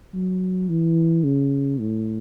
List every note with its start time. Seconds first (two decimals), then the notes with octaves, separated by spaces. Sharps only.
0.14 F#3
0.69 E3
1.24 C#3
1.80 A2